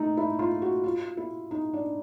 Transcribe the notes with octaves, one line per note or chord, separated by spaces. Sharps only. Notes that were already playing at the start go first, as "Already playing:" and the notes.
Already playing: A3 D#4
E4
F4
F#4
F4
E4
D#4
D4